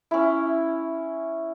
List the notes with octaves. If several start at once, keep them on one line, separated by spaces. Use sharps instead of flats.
C#4 E4